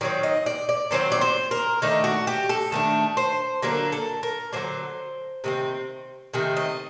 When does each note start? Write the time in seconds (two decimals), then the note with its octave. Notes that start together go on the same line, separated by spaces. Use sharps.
0.01 D#3 F#3 C4 D5
0.23 D#5
0.46 D5
0.69 D5
0.91 D#3 F#3 C4 C5
1.12 D5
1.21 C5
1.51 A#4
1.82 D#3 A3 D4 D#4
2.04 F#4
2.27 G4
2.49 A4
2.72 D#3 A3 D4
3.17 C5
3.62 D3 F#3 A#3 D4 A#4
3.92 A4
4.23 A#4
4.53 D3 F#3 A#3 D4 C5
5.44 C3 D#3 A3 C4
6.34 C3 D#3 A3 C4
6.57 D#5